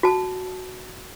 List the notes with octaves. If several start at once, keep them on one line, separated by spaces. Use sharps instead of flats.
F#4 A5